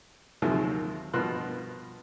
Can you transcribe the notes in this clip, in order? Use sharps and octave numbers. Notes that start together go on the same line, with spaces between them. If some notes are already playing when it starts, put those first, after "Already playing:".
D#2 C3 D#3 F3 F#3 G#3
G2 B2 F3 A#4 C6 F#6